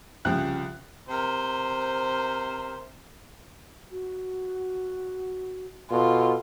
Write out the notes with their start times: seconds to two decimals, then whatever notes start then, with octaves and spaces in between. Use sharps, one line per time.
0.25 C2 C#3 F3 G5 F#6
1.10 C3 A#4 C5
3.91 F#4
5.91 B2 F4 A4